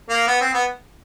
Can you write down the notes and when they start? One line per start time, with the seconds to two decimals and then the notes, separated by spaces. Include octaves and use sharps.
0.10 A#3
0.28 B3
0.41 C4
0.54 B3